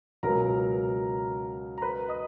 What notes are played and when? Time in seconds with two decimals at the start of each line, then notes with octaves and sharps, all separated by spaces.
0.23 C#2 B2 F#3 A#4 A#5
1.78 A#5
1.82 B4 B5
2.08 D#5 D#6